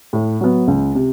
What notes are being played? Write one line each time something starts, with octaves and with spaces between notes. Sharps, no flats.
A2
F#3 B3
C#2
C3